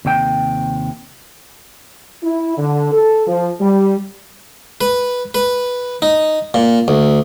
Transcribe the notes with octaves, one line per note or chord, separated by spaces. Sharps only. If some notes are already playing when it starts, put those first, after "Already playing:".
D#2 C3 G5
E4
D3
A4
F3
G3
B4
B4
D#4
A#2
D2